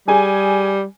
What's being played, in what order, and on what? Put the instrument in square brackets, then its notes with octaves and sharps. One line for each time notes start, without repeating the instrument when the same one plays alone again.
[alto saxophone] G3 [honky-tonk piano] G#4 G#5